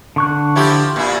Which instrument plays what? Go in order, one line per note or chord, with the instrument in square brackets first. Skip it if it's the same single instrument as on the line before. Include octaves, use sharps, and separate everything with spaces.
[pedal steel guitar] D3 C#6 F#6
[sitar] F3 E4 G4
A#2 E4